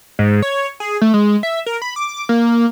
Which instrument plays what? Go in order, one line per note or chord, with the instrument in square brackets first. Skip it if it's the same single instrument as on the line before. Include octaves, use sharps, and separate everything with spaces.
[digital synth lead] G#2
C#5
G#4
A3
G#3
E5
A#4
B5
D6
A#3